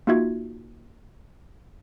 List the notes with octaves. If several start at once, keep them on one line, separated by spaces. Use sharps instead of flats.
A#3 D#4 F4 F#4 E5 G#6